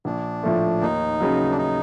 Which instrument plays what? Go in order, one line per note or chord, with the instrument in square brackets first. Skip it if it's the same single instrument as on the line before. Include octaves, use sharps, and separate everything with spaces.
[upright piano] A#1 [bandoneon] D4
[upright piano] A2 F3 A3
[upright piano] D#2 [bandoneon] D#4
[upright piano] C#3 F#3
[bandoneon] D4
D#4